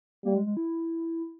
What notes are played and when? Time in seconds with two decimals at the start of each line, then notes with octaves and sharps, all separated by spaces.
0.25 G3 A#3
0.35 G#3
0.46 G#3
0.57 E4